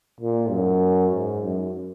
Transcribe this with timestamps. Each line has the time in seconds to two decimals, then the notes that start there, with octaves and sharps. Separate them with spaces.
0.21 A#2
0.51 F#2
1.12 G#2
1.43 F#2